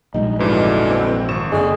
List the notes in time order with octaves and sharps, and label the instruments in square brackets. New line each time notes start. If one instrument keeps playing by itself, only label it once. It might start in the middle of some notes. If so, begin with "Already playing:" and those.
[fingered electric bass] A#1 G3 G#3 [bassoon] D#4
[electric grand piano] F2 G#2 [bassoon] B2 [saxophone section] D3 E3
[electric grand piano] C4
G#1 C#6 E7
[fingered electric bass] F#1 [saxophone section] D3 G#4 [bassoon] G#3